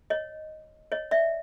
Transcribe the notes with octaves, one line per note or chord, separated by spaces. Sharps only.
C#5 D#5
C#5 D#5
D5 E5